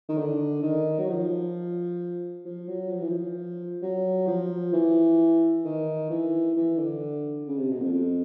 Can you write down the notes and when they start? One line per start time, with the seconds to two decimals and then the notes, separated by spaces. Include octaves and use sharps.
0.09 D#3
0.18 D3
0.63 D#3
0.99 F#3
1.09 F3
2.45 F3
2.68 F#3
2.91 F3
3.01 E3
3.09 F3
3.82 F#3
4.27 F3
4.73 E3
5.65 D#3
6.10 E3
6.56 E3
6.79 D3
7.47 C#3
7.58 C3
7.69 B2
7.82 F2
7.92 F2